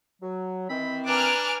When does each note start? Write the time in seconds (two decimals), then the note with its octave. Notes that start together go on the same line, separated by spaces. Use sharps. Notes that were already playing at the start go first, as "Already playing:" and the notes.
0.22 F#3
0.69 D#3 E3 C4 B5
1.07 D4 B4 G#5 A#5 D6 F6